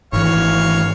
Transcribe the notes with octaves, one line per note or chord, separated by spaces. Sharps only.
G#1 E3 C#5 F5